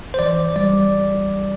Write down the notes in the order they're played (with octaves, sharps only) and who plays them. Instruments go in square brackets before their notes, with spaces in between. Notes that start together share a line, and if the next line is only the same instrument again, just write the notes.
[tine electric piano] C5
E3 D5
G3 D5